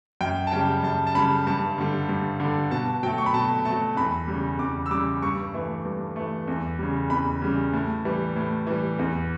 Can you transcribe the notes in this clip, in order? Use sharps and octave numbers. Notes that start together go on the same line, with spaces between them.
F#2 G5
A5
C#3 G3 G5
F#2 A5
A5
C#3 G3 B5
G2 A5
D3 G3
G2
D3 G3
B2 A5
F#3 A3 G5
C#6
B5
B2 A5
A3 A5
F#3
E2 B5
C#3 G3
E2 D6
E6
C#3 G3 D6
G2 C#6
E3 A3
G2
E3 A3
E2
C#3 G3
E2 B5
C#3 G3
A2
E3 G3
A2
E3 G3
E2